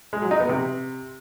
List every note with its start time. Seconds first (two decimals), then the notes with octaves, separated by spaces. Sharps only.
0.13 G#3
0.22 F#3
0.31 D#4
0.40 B3
0.49 C3